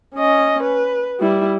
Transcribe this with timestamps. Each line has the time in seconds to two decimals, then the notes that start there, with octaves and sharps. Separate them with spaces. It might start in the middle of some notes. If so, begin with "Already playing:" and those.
0.15 C#4 D#5
0.63 B4
1.20 G3 E4